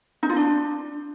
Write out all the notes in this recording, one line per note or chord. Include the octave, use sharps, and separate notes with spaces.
D#4
F4
D4